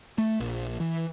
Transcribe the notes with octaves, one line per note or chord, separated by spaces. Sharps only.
A3
A#1
E3